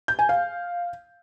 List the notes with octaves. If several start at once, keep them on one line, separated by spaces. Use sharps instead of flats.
G6
G#5
F5